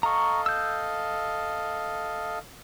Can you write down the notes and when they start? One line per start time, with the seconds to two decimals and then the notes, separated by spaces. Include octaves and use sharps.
0.03 A4 D#5 F5 A#5 C#6
0.46 E6 G6